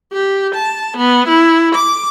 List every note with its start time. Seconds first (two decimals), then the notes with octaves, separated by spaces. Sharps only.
0.13 G4
0.55 A5
0.97 B3
1.28 E4
1.75 D6